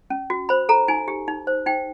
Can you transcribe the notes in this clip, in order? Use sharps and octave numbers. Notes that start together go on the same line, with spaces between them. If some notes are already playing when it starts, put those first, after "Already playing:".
C#4
F#4
C5 B5
A4 A#5
D#4 G#5
G4
D#4
C5
D#4 G5